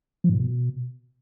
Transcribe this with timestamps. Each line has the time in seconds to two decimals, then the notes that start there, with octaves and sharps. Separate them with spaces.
0.24 F3
0.29 G#2
0.34 A#2
0.40 B2